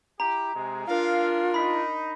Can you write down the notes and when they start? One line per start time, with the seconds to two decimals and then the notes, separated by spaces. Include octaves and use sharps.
0.20 E4 G4 A#5
0.55 C3 G#3
0.87 D4 F4 A#4 F5
1.54 D#4 B5 B6